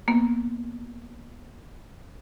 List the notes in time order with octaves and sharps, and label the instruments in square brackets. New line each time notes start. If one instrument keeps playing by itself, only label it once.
[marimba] A#3 B3